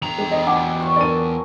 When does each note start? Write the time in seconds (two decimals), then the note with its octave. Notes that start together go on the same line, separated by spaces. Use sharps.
0.02 E2 C3 A#5 F7
0.18 G#3 G4
0.31 D#5
0.47 B2 F#5 G#5 D6
0.80 F#3 F4 F#4
0.96 A#4 D5 G#5 A5 D#7